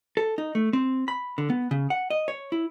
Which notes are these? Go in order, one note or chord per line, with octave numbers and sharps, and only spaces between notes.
A4
D#4
A3
C4
B5
D3
B3
C#3
F#5
D#5
C#5
E4